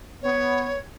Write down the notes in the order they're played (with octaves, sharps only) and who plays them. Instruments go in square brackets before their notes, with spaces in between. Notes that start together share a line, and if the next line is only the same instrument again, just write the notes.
[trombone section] B3 [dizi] C#5